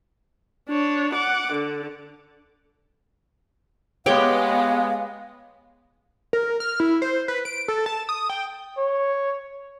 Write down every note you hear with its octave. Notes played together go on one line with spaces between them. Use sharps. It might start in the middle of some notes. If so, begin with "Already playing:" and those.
D4 C#5
F#5 D6
D3
G#3 B3 G4 C#5 F5 G5
A#4
F6
E4
C5
B4
D7
A4
A5
D#6
G5
C#5